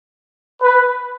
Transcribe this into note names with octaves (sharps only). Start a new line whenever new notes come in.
B4